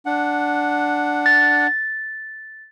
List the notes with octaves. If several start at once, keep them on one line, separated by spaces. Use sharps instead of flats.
D4 F#5
A6